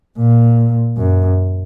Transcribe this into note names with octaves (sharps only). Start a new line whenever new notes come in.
A#2
F#2